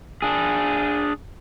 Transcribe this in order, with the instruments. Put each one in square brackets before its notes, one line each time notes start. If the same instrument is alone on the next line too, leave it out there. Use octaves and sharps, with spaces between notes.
[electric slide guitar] D4 G#4